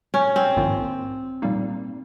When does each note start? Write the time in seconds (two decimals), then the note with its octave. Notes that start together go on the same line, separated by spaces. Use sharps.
0.14 C#4
0.36 C4
0.56 A#1 G#2 D#3 A#3 F4
1.42 A#2 G3 A#3 D#4